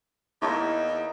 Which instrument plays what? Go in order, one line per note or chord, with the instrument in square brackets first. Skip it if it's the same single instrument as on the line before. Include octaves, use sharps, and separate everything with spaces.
[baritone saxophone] E2 [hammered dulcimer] A#3 D#4 E4